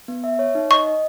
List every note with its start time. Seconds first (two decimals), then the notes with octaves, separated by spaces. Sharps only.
0.08 B3
0.24 E5
0.39 C#5
0.55 D#4
0.71 D#5 C#6
0.87 D#5